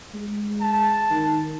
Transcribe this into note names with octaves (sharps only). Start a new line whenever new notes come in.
G#3
A5
D#3